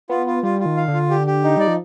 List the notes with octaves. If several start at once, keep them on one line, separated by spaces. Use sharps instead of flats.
B3 F4
F4
G3 F4
F4
D#3
F5
D3
F4
G4
G4
D#4
G3 D5
F3